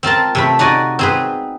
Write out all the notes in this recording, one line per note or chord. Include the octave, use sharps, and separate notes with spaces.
C4 F4 A#4 A5
C3 A3 B5
D#4 F#4 D5 D#5 G#5
C4 G#4 B4